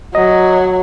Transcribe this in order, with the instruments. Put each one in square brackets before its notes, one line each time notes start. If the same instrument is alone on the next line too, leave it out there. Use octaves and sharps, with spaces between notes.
[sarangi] F#3 [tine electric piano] D#5